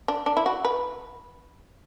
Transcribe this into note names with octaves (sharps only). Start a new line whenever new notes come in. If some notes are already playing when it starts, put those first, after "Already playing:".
D4
D4
E4
F#4
B4